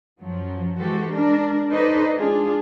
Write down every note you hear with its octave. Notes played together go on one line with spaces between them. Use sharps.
F#2 F3 F#3
E3 G#3 F#4 G4 A4 C5
G#3 D4 A#4
D#4 A4 B4 C5 D5 D#5
G#3 D4 F4 G#4